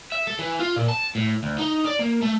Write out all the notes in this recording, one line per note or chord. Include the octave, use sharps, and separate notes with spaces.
E5
A4
E3
F4
A#2
A5
A2
D2
D#4
D5
A#3
A3